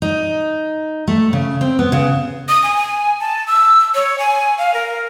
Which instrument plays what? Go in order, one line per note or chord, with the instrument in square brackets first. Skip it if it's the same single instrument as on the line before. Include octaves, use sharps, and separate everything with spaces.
[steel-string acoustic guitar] D#4
A3
C#3
C4
B3
C#3
[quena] D#6
G#5
G#5
A5
E6
C#5
G#5
F5
A#4